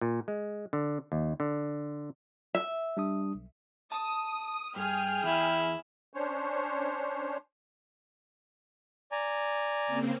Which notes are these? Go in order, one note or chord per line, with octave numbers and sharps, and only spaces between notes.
A#2
G#3
D3
D#2
D3
E5
G3 D4 D#6
B1
A5 D#6
G2 G#4 G5 F6
E2 E4
C#4 D4 C5 C#5
D5 G#5 A#5
C#3 A#3 C4